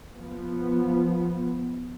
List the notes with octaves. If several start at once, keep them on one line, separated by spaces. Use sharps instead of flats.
F3 B3